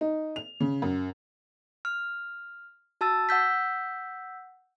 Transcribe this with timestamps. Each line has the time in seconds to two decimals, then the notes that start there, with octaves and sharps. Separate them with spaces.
0.01 D#4
0.36 F7
0.60 C#3
0.82 F#2
1.85 F6
3.01 F#4 A5 E6 A6
3.29 F#5 E6 G6 B6